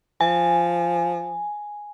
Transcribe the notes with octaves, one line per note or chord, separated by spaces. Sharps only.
F3 G#5